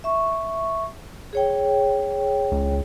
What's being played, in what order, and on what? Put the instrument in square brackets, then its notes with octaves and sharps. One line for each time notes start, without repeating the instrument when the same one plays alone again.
[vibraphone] E5 C#6
G#4 C#5 G5
[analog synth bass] C#2